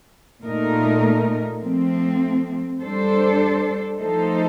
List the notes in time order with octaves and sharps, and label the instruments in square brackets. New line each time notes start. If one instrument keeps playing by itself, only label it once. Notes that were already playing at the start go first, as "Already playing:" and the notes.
[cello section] A#2 A3 D#4 A#4
F3 A3 C4
G3 D4 A4 C5
F3 A3 D#4 A4 C5